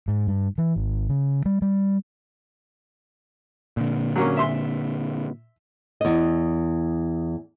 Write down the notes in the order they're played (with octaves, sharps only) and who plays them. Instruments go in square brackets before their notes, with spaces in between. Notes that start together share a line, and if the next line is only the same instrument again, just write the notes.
[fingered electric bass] G#2
G2
E3
G#1
C#3
G3
G3
[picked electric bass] A#2 D3
[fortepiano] F#3 A#3 C#4
E5 C6
[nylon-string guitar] E2 D#5